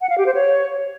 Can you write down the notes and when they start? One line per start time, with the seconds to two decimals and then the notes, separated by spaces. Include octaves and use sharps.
0.01 F#5
0.10 F5
0.18 G4
0.26 C5
0.35 C#5